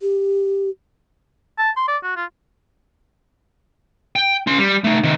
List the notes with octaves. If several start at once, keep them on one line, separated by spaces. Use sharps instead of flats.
G4
A5
C6
D5
F#4
F4
G5
C#4 C6
G3
A3 D#4
C3 D#3